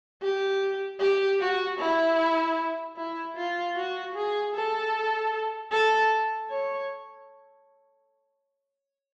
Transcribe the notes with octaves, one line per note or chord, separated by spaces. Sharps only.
G4
G4
F#4
E4
E4
F4
F#4
G#4
A4
A4
C#5